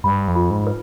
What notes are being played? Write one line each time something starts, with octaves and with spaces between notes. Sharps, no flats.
G2 B5
F2
F4
G#2
B4